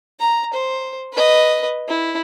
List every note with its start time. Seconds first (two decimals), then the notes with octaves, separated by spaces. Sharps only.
0.20 A#5
0.54 C5
1.12 B4 D#5
1.88 E4